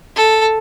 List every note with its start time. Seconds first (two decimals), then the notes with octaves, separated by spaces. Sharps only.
0.16 A4